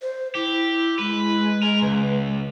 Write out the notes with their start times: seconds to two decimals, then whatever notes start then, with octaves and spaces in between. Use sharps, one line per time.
0.02 C5
0.35 E4 G4
0.99 G#3 B4
1.62 A#4
1.82 C#2 B4